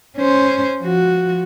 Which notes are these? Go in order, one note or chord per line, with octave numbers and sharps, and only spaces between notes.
C#4 C5
F3 F#4